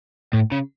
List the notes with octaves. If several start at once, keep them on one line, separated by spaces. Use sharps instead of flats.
A2
C#3